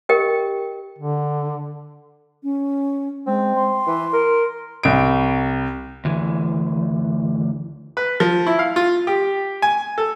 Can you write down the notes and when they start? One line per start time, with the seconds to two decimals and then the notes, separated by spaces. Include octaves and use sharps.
0.09 G4 A#4 D#5 G5
0.98 D3
2.43 C#4
3.27 G#3 C4
3.56 C6
3.87 E3
4.13 A#4
4.83 C2 D7
6.05 D2 E3
7.97 B4
8.20 F3
8.47 E4
8.59 F5
8.76 F4
9.07 G4
9.62 G#5
9.98 A4